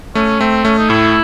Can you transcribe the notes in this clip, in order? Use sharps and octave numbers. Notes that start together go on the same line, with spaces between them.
A3 C#4
A3 C4
A3 C#4
D#4
A2 E4